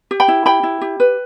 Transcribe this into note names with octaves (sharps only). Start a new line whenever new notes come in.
G4
G5 B5
E4
G4 G5 B5
E4
G4
B4